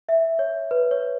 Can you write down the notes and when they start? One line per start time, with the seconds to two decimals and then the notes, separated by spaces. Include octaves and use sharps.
0.09 E5
0.39 C#5
0.71 B4
0.91 C#5